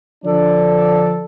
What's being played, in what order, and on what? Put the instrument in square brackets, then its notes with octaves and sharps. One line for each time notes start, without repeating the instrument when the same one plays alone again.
[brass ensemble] D3 F3 D4 A4 D5